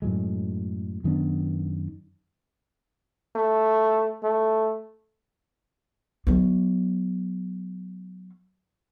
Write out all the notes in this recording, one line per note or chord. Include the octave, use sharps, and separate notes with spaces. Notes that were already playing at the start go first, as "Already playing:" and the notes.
F#2 A2 F#3 G#3
F#2 D#3 B3 D4
A3
A3
F#3 B3